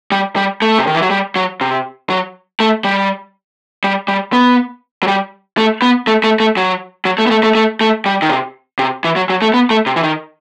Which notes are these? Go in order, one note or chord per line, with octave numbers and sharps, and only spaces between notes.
G3
G3
A3
C3
D#3
E3
F#3
G3
F#3
C3
F#3
A3
G3
G3
G3
B3
F#3
G3
A3
B3
A3
A3
A3
F#3
F#3
A3
B3
A3
A3
A3
A3
G3
D#3
C3
C3
E3
F#3
F#3
A3
B3
A3
C3
E3
D#3